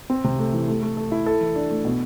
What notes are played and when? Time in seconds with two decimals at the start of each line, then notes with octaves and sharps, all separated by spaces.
0.10 C4
0.24 C3
0.39 A3
0.53 E3
0.68 A3
0.83 A3
0.97 A4
1.12 E4
1.26 A4
1.41 E3
1.56 D4
1.70 A3
1.85 B2